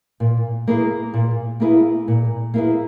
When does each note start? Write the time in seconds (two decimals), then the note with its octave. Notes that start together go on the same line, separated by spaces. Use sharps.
0.20 A#2
0.67 A#3 E4 G#4 B4
1.14 A#2
1.60 A#3 E4 G#4 B4
2.08 A#2
2.54 A#3 E4 G#4 B4